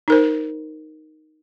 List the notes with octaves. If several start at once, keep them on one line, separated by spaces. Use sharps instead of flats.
D#4 A#4 C5